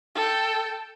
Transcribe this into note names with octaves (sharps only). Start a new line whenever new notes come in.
A4 G5